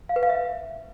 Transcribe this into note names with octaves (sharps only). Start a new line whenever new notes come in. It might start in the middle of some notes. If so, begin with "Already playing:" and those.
F5
B4
F5
E5